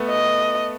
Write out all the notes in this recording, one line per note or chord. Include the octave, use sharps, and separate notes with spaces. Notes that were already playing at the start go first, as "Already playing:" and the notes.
Already playing: A3 B3
D#5